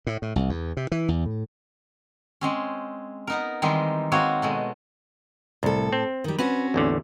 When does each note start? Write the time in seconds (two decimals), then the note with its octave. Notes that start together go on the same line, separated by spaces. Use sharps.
0.07 A2
0.22 A2
0.36 C2
0.49 E2
0.77 C3
0.92 E3
1.08 E2
1.26 A2
2.41 G#3 C4 C#4
3.27 B3 D#4 A#4
3.62 D#3 E3 G3 G#3 C4 D#4
4.12 G#3 A#3 C4 F#4 C#5
4.42 B2 G#3 A3
5.63 C2 A2 A4
5.93 C4
6.24 D#3 G3
6.39 C4 C#4 F#4 B4
6.74 A1 E2 D3